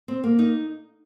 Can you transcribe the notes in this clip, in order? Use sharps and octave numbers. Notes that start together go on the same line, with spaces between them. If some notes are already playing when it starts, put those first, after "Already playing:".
C4
A#3
D#4